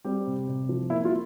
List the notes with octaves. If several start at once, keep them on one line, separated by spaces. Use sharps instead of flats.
G3 C4 G4
C3
C3
F3
A#3 E4
F4